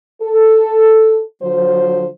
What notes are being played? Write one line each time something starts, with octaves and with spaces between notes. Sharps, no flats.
A4
D3 F3 F#3 C5